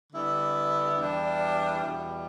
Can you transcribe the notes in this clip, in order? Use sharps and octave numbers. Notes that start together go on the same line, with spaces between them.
D3 G3 B3 E4
E2 E3 G3 D4
E2 B2 G3